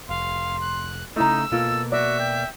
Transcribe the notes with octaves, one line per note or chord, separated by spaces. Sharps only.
F1 F5 C6
F#6
C#3 A3 D#4 E4 A#5 E6
B2 A#3 F4 A4
F#4 D5 E5
G5